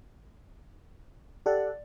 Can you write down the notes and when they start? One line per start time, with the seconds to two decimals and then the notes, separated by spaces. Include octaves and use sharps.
1.46 G4 A4 D5 F#5